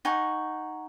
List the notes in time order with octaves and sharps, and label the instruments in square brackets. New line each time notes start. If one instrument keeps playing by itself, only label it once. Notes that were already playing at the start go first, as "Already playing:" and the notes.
[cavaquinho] D#4 F#5 G#5 C#6